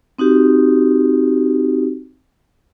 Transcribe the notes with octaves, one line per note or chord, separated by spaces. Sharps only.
C4 D#4 F#4 G4